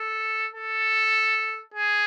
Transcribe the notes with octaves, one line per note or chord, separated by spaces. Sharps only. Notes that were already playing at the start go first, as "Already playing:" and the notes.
Already playing: A4
A4
G#4